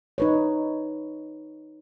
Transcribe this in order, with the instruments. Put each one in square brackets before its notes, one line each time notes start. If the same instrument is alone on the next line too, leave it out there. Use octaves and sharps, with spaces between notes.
[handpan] D#4 B4 C#5